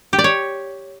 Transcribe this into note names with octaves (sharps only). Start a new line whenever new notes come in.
G4
D5
C#5